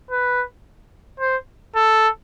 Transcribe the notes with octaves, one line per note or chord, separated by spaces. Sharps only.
B4
C5
A4